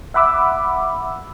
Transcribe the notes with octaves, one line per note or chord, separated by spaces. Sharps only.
E5 F#5 B5 D6 E6